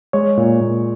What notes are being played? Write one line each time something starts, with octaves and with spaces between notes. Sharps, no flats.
G#3 C#5
A#2
A#2